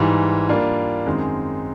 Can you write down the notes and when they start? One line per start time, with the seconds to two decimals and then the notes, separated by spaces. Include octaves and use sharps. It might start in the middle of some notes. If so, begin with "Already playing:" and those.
Already playing: G#2 E3 G3
0.49 G3 A#3 D4 F4
1.07 F#2 D#3 G#3 C4